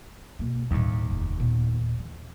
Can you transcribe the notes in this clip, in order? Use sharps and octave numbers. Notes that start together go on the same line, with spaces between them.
B2 A#3
D#2 A2 G3
F1 C#3
A#2 B3
E3